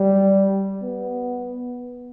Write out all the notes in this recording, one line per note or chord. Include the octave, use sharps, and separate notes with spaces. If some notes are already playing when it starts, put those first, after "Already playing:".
Already playing: G3
B3